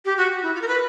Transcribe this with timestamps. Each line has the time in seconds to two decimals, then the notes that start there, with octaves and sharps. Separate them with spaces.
0.05 G4
0.17 F#4
0.42 E4
0.55 F4
0.62 A#4
0.68 B4